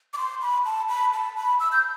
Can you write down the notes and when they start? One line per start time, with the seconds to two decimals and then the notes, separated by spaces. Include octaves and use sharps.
0.13 D6
0.18 C6
0.41 B5
0.65 A5
0.89 B5
1.13 A5
1.37 B5
1.60 E6
1.72 G6